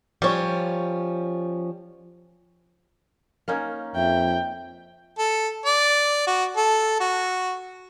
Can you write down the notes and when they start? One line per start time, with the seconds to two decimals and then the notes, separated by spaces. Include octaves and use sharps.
0.22 F3 G3 C#4 C#5
3.48 A#3 C#4 D#4
3.96 F2 E5 G5
5.18 A4
5.65 D5
6.27 F#4
6.57 A4
7.00 F#4